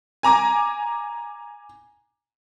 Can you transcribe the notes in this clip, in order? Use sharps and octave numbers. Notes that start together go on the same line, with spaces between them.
G#5 A#5 D6